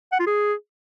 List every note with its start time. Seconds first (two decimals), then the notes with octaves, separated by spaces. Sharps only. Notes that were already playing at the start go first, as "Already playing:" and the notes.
0.12 F#5
0.19 F4
0.27 G#4